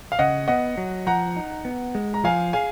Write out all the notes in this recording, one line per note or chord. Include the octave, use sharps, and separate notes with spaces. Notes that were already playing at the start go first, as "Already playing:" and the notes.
F5
C#3 D#5 F#5
B3 D#5 F#5
F#3
F3 F#5 A#5
D#4
B3
G#3
A#5
F3 F5 G#5
G#4 F5 G#5